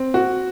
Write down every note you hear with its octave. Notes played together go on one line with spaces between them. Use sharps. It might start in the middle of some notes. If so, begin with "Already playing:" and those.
Already playing: C4
F#4